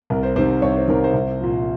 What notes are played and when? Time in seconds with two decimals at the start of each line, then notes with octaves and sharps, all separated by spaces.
0.10 C2 A#4
0.23 C5
0.36 C3 D#3 C5
0.62 C2 C#5
0.76 C5
0.88 C3 D#3 A#4
1.04 C5
1.14 C2
1.40 A#2 F3